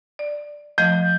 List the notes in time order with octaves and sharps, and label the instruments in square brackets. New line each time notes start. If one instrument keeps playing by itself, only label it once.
[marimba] D5
[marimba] F3 A3 D#5 [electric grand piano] G6